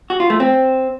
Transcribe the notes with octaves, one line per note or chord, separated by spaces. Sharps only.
F#4
F4
A3
C4